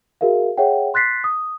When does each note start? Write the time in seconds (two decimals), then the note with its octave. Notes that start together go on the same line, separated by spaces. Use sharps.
0.21 F#4 G#4 A#4 E5 F5
0.57 G#4 C#5 E5 F#5 G5
0.94 C6 F#6 A6 B6 C7
1.24 D#6